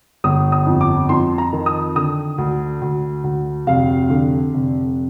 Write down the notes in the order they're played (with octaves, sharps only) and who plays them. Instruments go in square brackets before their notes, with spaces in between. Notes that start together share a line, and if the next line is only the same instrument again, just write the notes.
[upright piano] G1 D#6
D#6
F2
D6
F2 C6
A#5
D#3
D#6
D3 D#6
D2
D2
D2
F1 F5
D3
F1